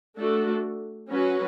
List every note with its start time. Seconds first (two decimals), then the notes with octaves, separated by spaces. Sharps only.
0.18 A3 D4 F#4 A4
1.10 F#3 C#4 F#4 B4